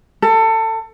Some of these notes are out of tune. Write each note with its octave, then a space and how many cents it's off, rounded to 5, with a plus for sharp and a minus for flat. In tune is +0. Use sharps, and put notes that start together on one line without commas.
A4 +25